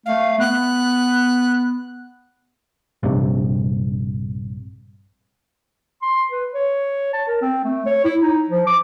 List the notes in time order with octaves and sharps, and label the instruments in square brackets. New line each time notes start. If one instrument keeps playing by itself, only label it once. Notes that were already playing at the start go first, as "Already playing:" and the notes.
[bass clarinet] A3 [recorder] F5
[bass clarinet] B3 [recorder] F#6
[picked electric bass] A#1 G2 C3
[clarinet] C6
B4
C#5
A5
A#4
C4
A3
C#5
E4
D#4
F3
D6